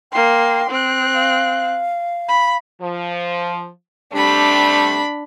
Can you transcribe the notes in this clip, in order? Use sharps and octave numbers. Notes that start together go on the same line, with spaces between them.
A#3 G5 C6
C4 C5 F#6
F5
B5
F3
C3 G3 A3 D4 B5